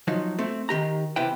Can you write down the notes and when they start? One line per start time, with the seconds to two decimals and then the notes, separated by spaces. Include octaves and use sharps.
0.07 F3 F#3 D#4
0.39 A3 C4
0.69 D#3 G4 A#5
1.16 E2 C3 E4 B4 G5